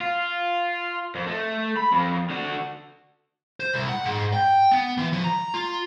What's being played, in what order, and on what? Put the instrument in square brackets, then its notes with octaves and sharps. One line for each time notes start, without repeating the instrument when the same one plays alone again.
[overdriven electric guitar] F4
F2
A3
B5
F2
D3 F#4
[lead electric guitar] C5
C2
F#5
G#2
G5
B3
E3
F3
A#5
F4